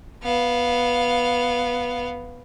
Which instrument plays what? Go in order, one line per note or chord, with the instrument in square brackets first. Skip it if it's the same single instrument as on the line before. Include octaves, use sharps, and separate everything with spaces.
[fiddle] B3 F5